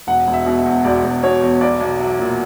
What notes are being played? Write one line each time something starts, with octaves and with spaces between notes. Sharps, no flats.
E1 F#5
E1
E5
B2
E5
E2
E1 D5
E1
B2 C#5
E2
B1 D5
B1
F#3 E5
A#2